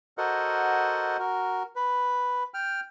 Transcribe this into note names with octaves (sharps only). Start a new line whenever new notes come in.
F#4 A4 A#4 C5 D#5 F#5
F#4 A#4
B4
G5 F6